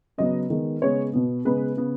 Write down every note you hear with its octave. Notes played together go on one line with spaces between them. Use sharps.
C#3 F#3 B3 D#5
D#3 G#3 B3
C#3 G#3 B3 C#5
B2 B3
C#3 G#3 B3 B4
C#3 B3